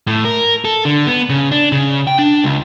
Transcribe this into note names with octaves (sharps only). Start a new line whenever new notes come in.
A2
A#4
A4
D3
B3
C#3
D4
C#3
G5
D4
C#2